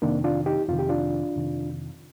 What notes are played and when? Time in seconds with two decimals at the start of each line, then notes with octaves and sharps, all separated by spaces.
0.02 F2 C3 D#3 A#3 D4
0.24 D4 F4
0.46 D#4 G4
0.68 F2 C3 D#3 F4
0.79 G4
0.89 D4 F4
1.36 F2 C3 D#3